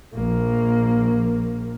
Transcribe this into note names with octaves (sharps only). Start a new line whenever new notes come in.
A#1 A#3